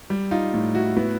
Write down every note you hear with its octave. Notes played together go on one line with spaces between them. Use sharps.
G3
D#4 F4
A2
E4 F#4
B3 E4 F#4